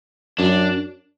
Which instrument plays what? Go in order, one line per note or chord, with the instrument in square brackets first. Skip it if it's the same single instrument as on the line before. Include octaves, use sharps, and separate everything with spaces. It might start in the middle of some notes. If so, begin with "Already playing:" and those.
[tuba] F#2 [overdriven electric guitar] D4